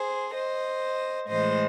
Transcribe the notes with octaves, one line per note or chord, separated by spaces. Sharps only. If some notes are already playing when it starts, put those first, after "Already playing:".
Already playing: G#4 C5
C5 D#5
A2 E3 G#3 C5 D#5